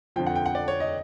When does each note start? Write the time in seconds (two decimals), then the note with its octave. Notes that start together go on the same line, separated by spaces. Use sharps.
0.16 F2 D3 F3 G5
0.26 F#5
0.36 G5
0.46 F#5
0.55 D5
0.68 C#5
0.80 D#5